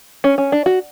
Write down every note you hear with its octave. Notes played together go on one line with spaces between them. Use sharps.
C#4
C#4
D4
F#4